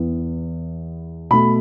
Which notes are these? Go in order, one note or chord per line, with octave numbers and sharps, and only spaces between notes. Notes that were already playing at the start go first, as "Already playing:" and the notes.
Already playing: E2 E3 B3
B2 A3 B5